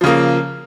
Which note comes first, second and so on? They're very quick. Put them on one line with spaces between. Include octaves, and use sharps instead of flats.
F3 C#3 A#3